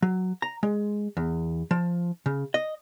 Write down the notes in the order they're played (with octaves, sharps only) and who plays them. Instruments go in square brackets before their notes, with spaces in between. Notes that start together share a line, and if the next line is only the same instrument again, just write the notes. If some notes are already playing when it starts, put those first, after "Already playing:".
[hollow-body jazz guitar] F#3
A#5
G#3
E2
F3
C#3
D#5